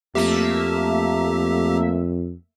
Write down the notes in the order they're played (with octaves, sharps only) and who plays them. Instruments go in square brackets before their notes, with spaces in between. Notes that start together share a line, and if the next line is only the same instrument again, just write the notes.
[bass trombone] F2 [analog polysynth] A3 A#3 E5 [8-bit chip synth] G4